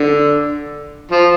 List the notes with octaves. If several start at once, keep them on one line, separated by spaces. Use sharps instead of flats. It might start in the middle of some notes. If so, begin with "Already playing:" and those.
Already playing: D3
F3